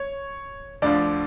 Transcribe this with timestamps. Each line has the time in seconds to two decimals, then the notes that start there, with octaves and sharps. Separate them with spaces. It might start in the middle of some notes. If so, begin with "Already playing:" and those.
Already playing: C#5
0.82 D2 D3 F3 D5